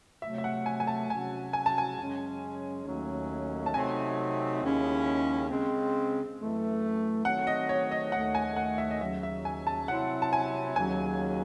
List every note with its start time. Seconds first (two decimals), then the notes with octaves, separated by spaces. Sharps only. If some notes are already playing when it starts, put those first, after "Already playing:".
0.22 C3 F#3 A3 E5
0.38 E5
0.44 F#5
0.66 G#5
0.80 G#5
0.87 A5
1.09 C3 F#3 C#4 F#4 G#5
1.53 G#5
1.66 A5
1.78 G#5
1.98 F#2 C#3 G#3 C#4
2.85 D#2 D#3 F#3 A3 C#4
3.66 A5
3.74 C3 F#3 A3 C4 D#4 G#5
4.61 D#2 C#3 G#3 C#4 E4
5.49 C#3 G#3 C4
6.38 F#2 E3 A3
7.24 D#3 F#3 A3 C4 F#5
7.47 D#5
7.69 C#5
7.91 D#5
8.12 D#2 D#3 A3 F#5
8.35 G#5
8.56 F#5
8.78 E5
8.91 D#5
9.00 D#2 C#3 F#3 E5
9.23 E5
9.45 G#5
9.67 A5
9.88 C3 F#3 C4 E4 F#5
10.22 A5
10.33 G#5
10.76 D#2 C#3 F#3 G#5